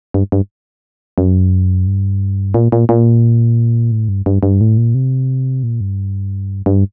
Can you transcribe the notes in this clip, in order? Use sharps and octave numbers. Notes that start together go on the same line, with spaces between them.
G2
G2
F#2
G2
A#2
A#2
A#2
A2
G2
G2
G2
A2
A#2
C3
A#2
G2
G2